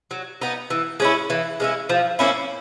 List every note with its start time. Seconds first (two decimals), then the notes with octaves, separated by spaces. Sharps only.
0.11 F#3
0.42 B3 D#4
0.70 E3
1.00 G#3 C#4 E4
1.30 E3
1.60 G#3 C#4 E4
1.89 F3
2.19 A#3 C#4 E4